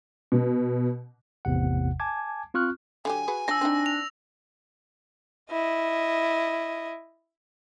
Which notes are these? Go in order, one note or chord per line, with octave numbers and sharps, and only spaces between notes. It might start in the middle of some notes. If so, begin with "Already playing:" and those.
B2
A1 E2 C3 F#5
G#5 A5 D6 G#6
C4 F4 C#6 F6 F#6
D3 F#3 G4 G#5
F#4 G#4 B4
F3 D4 A5 E6 A#6
C4 D4 D#4
F7
E4 D#5